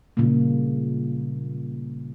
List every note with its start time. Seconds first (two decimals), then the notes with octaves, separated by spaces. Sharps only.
0.17 A#2 C#3 G3 A#3